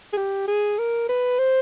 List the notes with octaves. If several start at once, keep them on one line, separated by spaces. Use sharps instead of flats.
G#4
G4
G#4
A#4
B4
C5